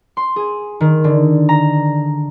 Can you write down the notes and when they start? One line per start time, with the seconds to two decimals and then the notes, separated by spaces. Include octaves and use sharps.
0.17 C6
0.36 G#4
0.81 D#3
1.04 D3
1.49 A#5